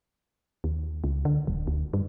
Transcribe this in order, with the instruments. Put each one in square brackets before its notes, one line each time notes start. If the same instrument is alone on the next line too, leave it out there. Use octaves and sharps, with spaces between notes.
[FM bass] D#2
C#2
D3
D#1
D2
G2